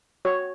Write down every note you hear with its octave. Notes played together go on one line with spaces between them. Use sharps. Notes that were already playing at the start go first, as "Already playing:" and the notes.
F#4 C#5